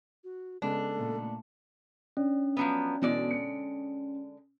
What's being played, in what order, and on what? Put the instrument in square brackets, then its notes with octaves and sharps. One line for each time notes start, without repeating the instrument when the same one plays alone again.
[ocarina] F#4
[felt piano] C#3 G#3 B3 [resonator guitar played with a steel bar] D4 [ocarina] A4
[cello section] A#2 A3
[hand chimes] C#4 [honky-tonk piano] D4
[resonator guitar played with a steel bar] F3 F#3 B3
[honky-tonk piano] B2 E3 [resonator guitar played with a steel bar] D3 G#3 D5
[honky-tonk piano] C#7